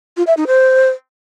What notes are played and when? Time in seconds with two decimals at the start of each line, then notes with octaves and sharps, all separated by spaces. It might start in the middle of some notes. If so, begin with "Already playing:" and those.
0.17 F4
0.27 E5
0.37 D#4
0.47 C5